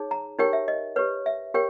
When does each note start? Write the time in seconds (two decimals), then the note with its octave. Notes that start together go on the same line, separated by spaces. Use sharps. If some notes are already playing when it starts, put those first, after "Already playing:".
Already playing: D#4 G#4 C#5
0.11 A#5
0.39 D#4 G4 A#4 C#5 G5
0.53 E5
0.68 D#5
0.96 G4 B4 C#5
1.26 E5
1.54 G4 A#4 C#5 G5